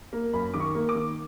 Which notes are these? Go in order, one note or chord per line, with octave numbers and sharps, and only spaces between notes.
A#3
F#2 B5
D#3 D6
C#6
A#3
D6
D#3